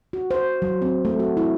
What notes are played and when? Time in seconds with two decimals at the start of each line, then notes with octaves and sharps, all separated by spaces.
0.13 F#4
0.31 C5
0.62 F#3
0.82 C4
1.05 A3
1.19 F#4
1.37 E4